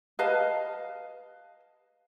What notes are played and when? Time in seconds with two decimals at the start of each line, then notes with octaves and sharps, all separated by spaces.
0.19 B4 D#5 F5 A5